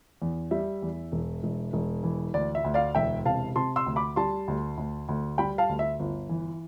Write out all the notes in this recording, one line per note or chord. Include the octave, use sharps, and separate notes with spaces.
E2
G3 E5
E2
E1
E1
E1
E3
D2 D5
E5
D2
D5 F5
E1 E5 G5
C3 F5 A5
C3 A5 C6
C6 E6
D2
B5 D6
G3 A5 C6
D2
D2
D2
G3 G5 B5
F5 A5
D2
E5
G1
E3